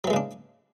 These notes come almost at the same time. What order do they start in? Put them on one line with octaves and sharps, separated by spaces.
F#3 E3 G#3 C#3 D4